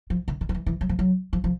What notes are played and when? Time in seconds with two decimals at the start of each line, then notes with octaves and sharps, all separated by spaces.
0.10 F3
0.28 D3
0.41 D#3
0.49 F3
0.55 E3
0.66 E3
0.81 F#3
0.89 F3
0.99 F#3
1.33 F3
1.44 F3